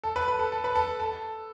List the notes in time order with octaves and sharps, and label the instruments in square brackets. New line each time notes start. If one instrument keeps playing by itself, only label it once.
[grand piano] A4
B4
B4
A4
A4
B4
A4
A4